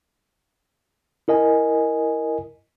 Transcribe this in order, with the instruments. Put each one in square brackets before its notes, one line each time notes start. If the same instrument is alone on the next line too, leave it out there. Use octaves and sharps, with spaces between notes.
[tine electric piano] E4 A#4 D#5 G#5